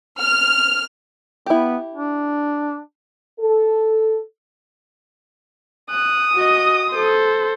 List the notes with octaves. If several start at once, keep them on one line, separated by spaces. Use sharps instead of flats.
F6
B3 E4 G4
D4
A4
D#6 F#6
F#4 D#5
A4 C5